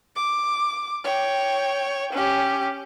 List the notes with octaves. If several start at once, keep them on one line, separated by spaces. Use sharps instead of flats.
D6
C#5 G5
C#4 G4